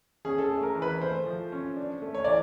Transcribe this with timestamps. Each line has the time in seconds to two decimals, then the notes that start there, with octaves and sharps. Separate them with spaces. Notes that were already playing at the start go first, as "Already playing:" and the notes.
0.25 C#4 G#4
0.38 A4
0.44 G#4
0.50 A3
0.63 A#4
0.75 E3
0.82 B4
1.01 A3 C5
1.26 F3
1.52 C#4
1.76 D4
2.02 A3
2.15 C#5
2.24 E3 D5